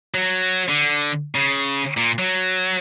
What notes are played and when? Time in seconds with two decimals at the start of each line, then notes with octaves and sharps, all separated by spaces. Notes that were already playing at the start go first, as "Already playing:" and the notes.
0.14 F#3
0.69 D3
1.35 C#3
1.97 A#2
2.19 F#3